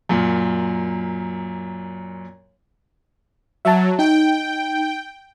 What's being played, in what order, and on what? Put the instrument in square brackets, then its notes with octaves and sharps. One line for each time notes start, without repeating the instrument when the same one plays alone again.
[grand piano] F#2 A#2
[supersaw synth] F#3 [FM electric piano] E5 A5
[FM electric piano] D#4 [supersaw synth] G5